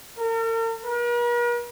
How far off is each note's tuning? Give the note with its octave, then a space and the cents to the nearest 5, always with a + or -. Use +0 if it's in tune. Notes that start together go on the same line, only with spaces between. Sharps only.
A#4 -40
A#4 +45